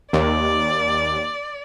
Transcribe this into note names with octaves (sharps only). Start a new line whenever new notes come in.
D#2 D5